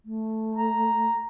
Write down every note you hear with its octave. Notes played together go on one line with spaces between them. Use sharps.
A3
A#5